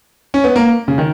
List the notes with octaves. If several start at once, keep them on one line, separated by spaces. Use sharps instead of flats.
C#4
B3
A#3
C#3
D#3